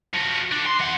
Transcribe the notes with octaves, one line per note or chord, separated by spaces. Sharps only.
F3 F#4
D3 D4
C6
E3 F#5